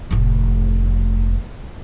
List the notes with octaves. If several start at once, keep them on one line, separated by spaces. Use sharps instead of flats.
F1 A2